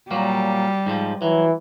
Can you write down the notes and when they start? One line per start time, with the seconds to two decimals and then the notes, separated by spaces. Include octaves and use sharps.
0.11 A#2 F#3 G3 A#3
0.86 G#2 F3
1.22 E3 F#3